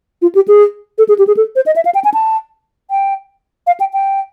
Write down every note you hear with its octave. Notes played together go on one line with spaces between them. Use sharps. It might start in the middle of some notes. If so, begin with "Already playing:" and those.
F4
G4
G#4
A4
G#4
G4
G#4
A4
C5
D#5
E5
F5
G5
G#5
A5
G5
F5
G5
G5